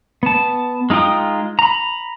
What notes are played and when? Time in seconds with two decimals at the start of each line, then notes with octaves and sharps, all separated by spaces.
0.23 B3 A5
0.90 G#3 D#4 F4 G5 D#6
1.59 A#5 B5